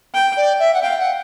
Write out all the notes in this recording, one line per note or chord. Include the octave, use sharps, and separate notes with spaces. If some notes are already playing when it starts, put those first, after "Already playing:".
G5
D5
E5
F#5
F5 G5
F#5